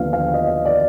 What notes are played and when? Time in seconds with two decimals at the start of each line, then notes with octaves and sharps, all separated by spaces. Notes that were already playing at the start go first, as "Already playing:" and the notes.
Already playing: D#2 D3 F3 B3 F5
0.13 F5
0.34 D#5
0.65 D5